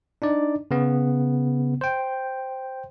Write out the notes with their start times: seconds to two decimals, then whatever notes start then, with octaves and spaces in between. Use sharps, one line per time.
0.22 D4 D#4 D5
0.71 C#3 B3
1.81 C5 G5